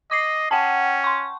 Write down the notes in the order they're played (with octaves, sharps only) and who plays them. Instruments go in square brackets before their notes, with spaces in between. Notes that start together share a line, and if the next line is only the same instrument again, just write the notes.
[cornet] D#5 [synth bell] D6 C7
[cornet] C#4 [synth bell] F#5 G5 A5
[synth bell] C6 C#6